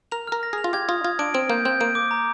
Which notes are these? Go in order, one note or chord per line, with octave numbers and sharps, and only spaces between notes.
A#4 F7
A#4 F6
A#6
G#4 F7
F4
G4 G#6
F4 D#6
F4 G#6
D4 D7
C4 D7
A#3 G6
C4 G6
A#3 D7
D6
A#5